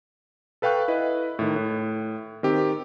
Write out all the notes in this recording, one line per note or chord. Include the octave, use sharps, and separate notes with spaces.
A4 B4 F5 G5 C#6 F#6
E4 B4 D#5
A2 D#3
A2
D#3 C4 G4